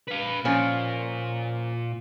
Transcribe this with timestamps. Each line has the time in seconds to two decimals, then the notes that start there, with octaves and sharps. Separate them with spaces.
0.08 B4 F5
0.45 A#2 F3 C#4